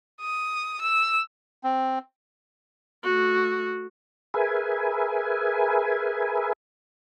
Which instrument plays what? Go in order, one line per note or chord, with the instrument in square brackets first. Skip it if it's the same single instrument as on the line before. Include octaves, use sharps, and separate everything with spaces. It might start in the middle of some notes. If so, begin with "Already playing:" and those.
[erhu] D#6
E6
[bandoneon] C4
[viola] A3 F#4
[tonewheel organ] G#4 A#4 B4 E5 G#5